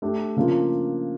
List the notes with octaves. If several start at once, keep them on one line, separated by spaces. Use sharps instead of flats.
A3 D4 G4
C#3 F3 A#3 D4 F4